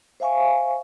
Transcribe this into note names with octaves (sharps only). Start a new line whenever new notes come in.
C5 E5 F5 G#5 C#6